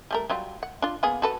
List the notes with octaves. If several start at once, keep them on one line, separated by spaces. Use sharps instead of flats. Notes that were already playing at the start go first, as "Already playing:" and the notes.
G3 A3 A#4
F#3 G3 F4
F#5
D4 F4
A#3 B3 G#4
F#4 A4 B4